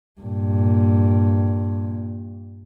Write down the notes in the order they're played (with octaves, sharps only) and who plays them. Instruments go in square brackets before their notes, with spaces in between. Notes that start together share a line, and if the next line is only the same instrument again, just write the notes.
[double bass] G2 A#2